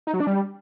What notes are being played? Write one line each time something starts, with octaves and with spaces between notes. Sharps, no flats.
D#4
F#3
D4
G3